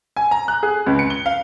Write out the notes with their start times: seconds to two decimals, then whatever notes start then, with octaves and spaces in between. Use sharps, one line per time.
0.16 G#5
0.31 A#5
0.48 F#6
0.63 G#4
0.86 C#2
0.99 C#7
1.10 G7
1.26 F5